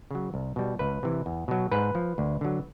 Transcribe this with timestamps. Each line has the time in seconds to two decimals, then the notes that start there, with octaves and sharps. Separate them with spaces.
0.11 C#3 F#3
0.34 C2
0.56 B2 G3
0.79 C#2 B4
1.03 C3 E3
1.26 E2
1.48 B2 F#3
1.72 G#2 B4
1.95 F3
2.18 D2
2.41 D3 F#3